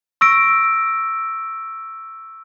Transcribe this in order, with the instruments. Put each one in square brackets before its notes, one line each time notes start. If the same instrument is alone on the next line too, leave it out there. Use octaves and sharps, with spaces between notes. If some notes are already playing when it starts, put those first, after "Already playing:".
[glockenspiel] C#6 E6 A#6 D7